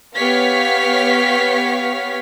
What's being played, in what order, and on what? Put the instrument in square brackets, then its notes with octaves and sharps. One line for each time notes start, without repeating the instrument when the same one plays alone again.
[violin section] B3 G4 C#5 F5 F6 B6